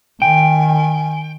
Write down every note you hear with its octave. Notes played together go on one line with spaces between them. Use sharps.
D#3 G5 G#5